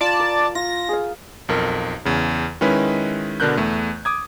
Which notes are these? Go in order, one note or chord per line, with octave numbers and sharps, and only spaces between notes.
F4 D5 A5
A#4
F4 A#6
G#4 F5
B1 F2 A#4
E2 C#3
D#3 G#3 C#4 E4 B4
B2 D3 D4 A#4 F#6 G6
E2 A3
D6 D#6 G#6